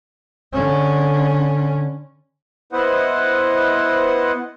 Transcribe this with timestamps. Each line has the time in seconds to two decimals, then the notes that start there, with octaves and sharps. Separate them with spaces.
0.54 D3 C#4
2.72 B3 E4 B4 C5 D#5 F#5